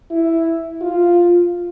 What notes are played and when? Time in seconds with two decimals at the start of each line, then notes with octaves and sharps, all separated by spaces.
0.11 E4
0.81 F4